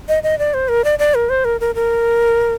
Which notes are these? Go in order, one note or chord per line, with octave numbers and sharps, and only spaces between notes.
D#5
D#5
D5
C5
A#4
D5
D5
A#4
C5
A#4
A#4
A#4